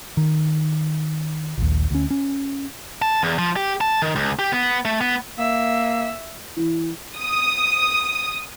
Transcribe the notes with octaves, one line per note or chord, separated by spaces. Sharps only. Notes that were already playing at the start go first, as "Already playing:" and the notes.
D#3
A#1 D#2
D2 C#4
C#4
A5
E2
F3
G4
A5
D#3
C#2
G4
B3
A3
B3
A#3 E5
E3
D#6